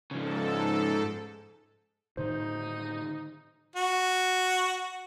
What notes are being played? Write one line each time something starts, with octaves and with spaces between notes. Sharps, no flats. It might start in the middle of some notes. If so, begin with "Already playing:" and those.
G#2 C#3 F3 A4
A2 D3 D#3 D#4 C5
F#4